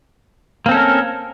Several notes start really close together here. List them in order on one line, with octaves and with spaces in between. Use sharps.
A#3 C4 A4 C#4 A#4